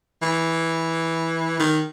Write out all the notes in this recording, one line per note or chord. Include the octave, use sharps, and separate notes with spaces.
E3
D#3